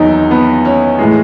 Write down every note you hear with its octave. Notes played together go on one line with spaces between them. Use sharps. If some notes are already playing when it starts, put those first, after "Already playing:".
Already playing: E2 D#3 F#3 D#4
B3
C#4
A2 E3 G#3